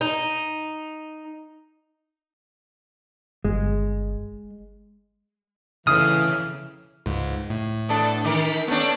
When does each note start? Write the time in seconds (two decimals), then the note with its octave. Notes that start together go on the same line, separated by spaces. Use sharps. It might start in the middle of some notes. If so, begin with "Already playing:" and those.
0.01 D#4
3.45 G1 G#3
5.87 A2 C#3 E3 D#6 F6
7.06 C#2 G#2
7.50 A2
7.89 B3 D4 A4
8.24 D#3 A#4
8.46 B6
8.68 A3 B3 C#4 D4